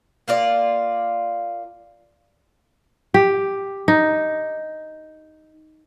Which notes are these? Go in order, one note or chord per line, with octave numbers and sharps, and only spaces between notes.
A#3 F4 D5
G4
D#4